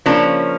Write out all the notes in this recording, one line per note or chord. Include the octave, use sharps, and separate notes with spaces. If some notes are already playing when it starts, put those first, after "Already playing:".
C#3 F3 A#3 C#4 D4